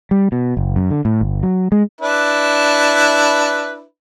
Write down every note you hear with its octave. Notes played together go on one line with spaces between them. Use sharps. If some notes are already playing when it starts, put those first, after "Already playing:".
G3
B2
F#1
F#2
D3
A2
G1
F#3
G#3
D4 E4 B4